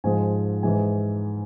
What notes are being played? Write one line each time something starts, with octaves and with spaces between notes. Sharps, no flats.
G#2 F3 G#3 G#5
G#2 E3 G#3 G#5